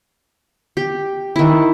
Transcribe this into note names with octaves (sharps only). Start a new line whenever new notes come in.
G4
D#3 E4